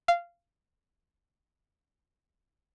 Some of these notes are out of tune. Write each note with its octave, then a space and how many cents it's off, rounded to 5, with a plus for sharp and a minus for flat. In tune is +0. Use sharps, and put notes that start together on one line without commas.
F5 -15